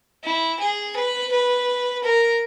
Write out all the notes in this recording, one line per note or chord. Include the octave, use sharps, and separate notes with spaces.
E4
G#4
B4
B4
A#4